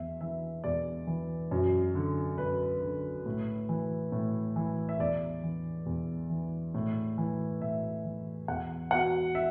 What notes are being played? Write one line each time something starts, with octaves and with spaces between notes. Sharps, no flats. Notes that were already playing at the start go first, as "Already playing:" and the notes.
Already playing: E2 E5
E3 E5
E2 D5
E3
F#2
D3
F#2 B4
D3
A2
E3
A2
E3
E5
E2 D5
E3
E2
E3
A2
E3
A2 E5
E3
E2 F#5
B2 F#5
E5